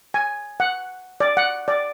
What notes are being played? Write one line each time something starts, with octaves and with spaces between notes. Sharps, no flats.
G#5
F#5
D5
F#5
D5